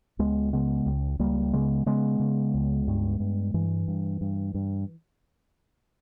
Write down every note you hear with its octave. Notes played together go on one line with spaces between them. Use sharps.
C#2 G#3 B3
C#3 G#3 B3
C#2
C#2 G3 A#3
C#3 G#3 B3
C#3 G#3 B3
C#3
C#2
G2
G2
G2 E3
G2
G2
G2